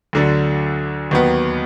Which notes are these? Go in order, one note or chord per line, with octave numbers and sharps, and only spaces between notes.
D2 D3 F#3 D4
D#2 D#3 F#3 B3